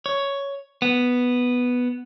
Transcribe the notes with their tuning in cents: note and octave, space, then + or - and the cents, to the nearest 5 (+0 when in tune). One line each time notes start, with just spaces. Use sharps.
C#5 +5
B3 +0